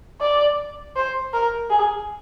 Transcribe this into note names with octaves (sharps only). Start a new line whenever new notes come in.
D5
C5
A#4
G#4